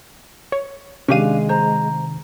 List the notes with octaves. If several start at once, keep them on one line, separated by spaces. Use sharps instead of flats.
C#5
C3 D#3 G#3 C#4 D4 G4 F5 D#7
C5 A#5